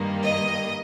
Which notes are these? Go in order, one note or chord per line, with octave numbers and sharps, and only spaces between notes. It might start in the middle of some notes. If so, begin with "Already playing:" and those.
Already playing: G2 D#3 G3 A#3
D#5